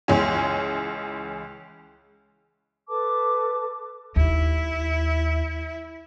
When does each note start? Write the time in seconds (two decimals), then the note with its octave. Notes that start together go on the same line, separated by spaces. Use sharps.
0.08 C#2 E3 G#3 C#4
2.88 A4 B4 A5 D6
4.16 D#2 E4